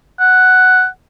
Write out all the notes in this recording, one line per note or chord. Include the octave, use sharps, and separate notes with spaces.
F#5